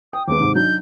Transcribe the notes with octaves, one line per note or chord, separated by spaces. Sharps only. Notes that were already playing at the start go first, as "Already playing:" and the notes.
G5 D#6
D#2 G#3 B3 D6
G#2 C3 D#3
F#3 D4 D#4 G6